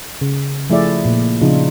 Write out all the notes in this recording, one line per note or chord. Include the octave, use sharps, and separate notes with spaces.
C#3
F3 A3 E4 G#4 D5 E5
A#2
C#3 F3 D4 D#4 F4